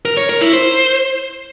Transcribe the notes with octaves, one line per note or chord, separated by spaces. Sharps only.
A#4
C#5
A#4
E4
C5